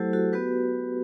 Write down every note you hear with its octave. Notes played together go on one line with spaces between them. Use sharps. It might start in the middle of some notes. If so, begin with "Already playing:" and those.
Already playing: F#3 A3 E4 G4 A4 C5
F#4 A4
B3 F#4 G4 B4